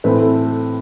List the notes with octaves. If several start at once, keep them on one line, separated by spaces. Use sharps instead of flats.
A2 E3 A3 C4 B4
A4